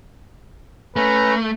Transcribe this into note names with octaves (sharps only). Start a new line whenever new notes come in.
A3 C#4 B4 A#5